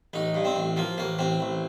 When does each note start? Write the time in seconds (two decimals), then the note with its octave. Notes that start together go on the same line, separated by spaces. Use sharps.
0.13 A1 D#4
0.34 G2
0.45 C4
0.56 A1
0.76 F3 A#3
0.98 A1 A#3
1.19 A1 C4
1.40 A1